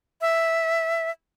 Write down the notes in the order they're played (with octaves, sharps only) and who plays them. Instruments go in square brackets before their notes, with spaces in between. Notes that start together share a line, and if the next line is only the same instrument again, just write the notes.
[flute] E5